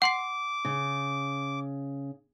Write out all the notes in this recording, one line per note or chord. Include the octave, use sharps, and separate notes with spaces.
F#5 C6 D6 C7
C#3